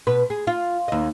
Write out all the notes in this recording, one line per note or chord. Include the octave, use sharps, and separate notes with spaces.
B2 B4
G#4
F4
D#2 D#5